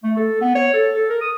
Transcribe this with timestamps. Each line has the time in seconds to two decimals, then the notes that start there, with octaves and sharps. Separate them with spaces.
0.03 A3
0.17 A4
0.42 B3
0.55 C#5
0.74 A4
0.94 A4
1.09 A#4
1.21 D#6